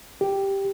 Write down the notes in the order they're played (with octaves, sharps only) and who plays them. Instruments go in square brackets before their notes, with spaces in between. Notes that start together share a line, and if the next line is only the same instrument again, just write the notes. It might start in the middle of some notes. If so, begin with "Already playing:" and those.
[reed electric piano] G4